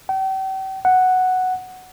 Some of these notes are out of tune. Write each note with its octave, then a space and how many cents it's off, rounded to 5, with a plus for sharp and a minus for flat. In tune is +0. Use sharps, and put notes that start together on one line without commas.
G5 -40
F#5 +0